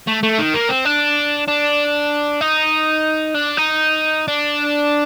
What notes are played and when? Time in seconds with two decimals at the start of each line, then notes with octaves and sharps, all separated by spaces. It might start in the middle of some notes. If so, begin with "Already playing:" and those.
0.07 A3
0.23 A3
0.38 D#3
0.54 A#3
0.69 C4
0.85 D4
1.48 D4
2.41 D#4
3.35 D4
3.58 D#4
4.28 D4